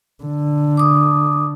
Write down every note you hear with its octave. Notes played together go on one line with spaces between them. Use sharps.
D3
D6 D#6